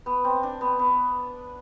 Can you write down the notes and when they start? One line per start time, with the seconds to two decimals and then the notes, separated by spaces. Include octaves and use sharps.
0.06 B3
0.24 C4
0.43 D4
0.61 B3
0.79 B3